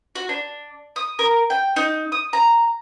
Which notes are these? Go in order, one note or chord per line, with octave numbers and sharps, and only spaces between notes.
F#4
D4
D#6
A#4
G5
D#4
D#6
A#5